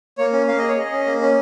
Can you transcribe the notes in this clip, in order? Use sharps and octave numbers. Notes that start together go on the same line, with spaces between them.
A#3 C#5
C#4
A#3 F5
G#4 D#5
C#5
G#4 D#5
C#4
A#3
C#4